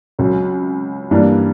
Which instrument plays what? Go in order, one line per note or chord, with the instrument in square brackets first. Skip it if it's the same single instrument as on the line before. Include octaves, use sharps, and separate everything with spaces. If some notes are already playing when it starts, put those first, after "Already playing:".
[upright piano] C#2 C#3 F#3
G2 E3 G3 A#3 D4